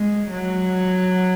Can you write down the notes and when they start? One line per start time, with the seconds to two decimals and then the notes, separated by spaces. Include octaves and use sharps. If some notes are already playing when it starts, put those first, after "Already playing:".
Already playing: G#3
0.30 F#3